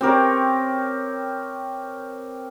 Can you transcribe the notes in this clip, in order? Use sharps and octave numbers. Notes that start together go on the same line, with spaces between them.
C4 G4 A#4 C#5